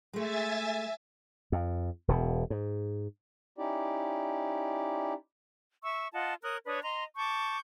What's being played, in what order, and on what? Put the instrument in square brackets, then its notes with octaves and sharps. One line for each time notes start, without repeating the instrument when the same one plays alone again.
[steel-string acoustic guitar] G#3 A3 [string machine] E5 G#5 A6
[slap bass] F2
E1 B2
G#2
[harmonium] C#4 D#4 E4 G4 D5
[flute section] E5 C#6 E6
F4 D#5 F#5 A5
A#4 C#5 D#6 F#6
D4 B4 C#5 D#6
D#5 A#5 C6
A5 C#6 D6 G6